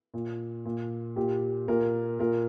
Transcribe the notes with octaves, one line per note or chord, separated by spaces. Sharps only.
A#2
A#2
A#2 G4
A#2 A#4
A#2 A#4